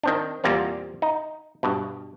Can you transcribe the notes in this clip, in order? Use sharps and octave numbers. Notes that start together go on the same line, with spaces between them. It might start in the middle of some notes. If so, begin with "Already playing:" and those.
D#3 C4 D4
E2 A#2 G3 A#3 C4
D#4
G2 B2